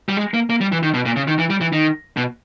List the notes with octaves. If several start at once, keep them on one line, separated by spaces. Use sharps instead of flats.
G3
G#3
A#3
A#3
G3
E3
D#3
B2
A#2
C#3
D#3
E3
G3
E3
D#3
B2